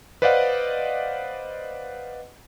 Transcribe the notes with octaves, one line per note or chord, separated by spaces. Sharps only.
B4 C5 D5 D#5 F5 F#5